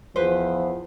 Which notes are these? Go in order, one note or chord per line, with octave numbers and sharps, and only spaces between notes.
E2 F3 B4 C5